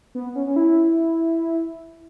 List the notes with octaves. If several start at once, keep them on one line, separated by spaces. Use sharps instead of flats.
B3
C#4
C#4
E4